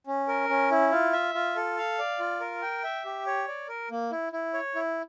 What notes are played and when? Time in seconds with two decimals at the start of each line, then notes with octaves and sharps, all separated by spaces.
0.07 C#4
0.28 A#4
0.49 C#4
0.71 E4
0.92 F4
1.13 E5
1.35 F4
1.56 A4
1.78 F5
1.99 D5
2.19 F4
2.41 A#4
2.62 G5
2.84 E5
3.05 G4
3.26 C#5
3.48 D5
3.68 A#4
3.91 A#3
4.11 E4
4.33 E4
4.53 C#5
4.75 E4